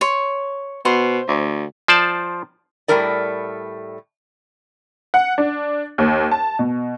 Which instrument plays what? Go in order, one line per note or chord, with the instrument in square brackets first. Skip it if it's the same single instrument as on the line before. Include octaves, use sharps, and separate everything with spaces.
[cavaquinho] C#5 C6
[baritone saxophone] B2 [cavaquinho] C5
[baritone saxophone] D2
[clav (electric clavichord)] F3 C5 D5 A5
[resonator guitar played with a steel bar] A2 G3 A3 D#4 A#4 D5
[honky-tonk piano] F#5
D4
D#2
A5
B2